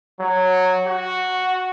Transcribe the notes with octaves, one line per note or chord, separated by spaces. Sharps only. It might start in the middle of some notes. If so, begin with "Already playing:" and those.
F#3
F#4